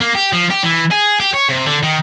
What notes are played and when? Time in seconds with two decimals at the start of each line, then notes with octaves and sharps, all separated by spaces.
0.01 A#3
0.15 G4
0.33 F3
0.50 G4
0.63 E3
0.91 G#4
1.20 G4
1.34 C#5
1.49 C3
1.66 D3
1.83 D#3